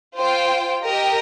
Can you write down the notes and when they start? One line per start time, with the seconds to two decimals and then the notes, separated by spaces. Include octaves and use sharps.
0.17 F4 C5 G5
0.82 G4 A#4 D#5 G5